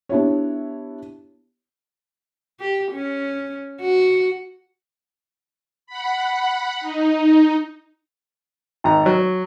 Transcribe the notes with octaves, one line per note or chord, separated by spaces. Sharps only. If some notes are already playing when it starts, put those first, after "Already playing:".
B3 D4 E4 G4 C#5
G4
C#4
F#4
F#5 B5
D#4
G#1 A#5
F#3